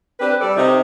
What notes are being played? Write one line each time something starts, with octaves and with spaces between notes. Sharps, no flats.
C4 D4 G4 B4
G3 A4 D5
C3 D#4